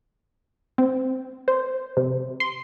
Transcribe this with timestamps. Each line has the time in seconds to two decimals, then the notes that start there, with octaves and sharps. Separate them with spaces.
0.78 C4
1.48 C5
1.97 C3
2.40 C6